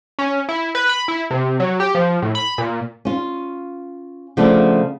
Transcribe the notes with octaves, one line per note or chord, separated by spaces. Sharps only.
C#4
E4
B4
B5
E4
C3
F#3
G4
F3
A2
B5
A#2
C#4 F4
C#3 F3 A3 B3 D4 F4